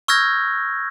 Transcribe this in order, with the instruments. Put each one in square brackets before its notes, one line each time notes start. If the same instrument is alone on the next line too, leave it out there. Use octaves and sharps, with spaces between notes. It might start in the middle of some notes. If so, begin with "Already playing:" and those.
[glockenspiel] C#6 E6 F6 G6 G#6 A#6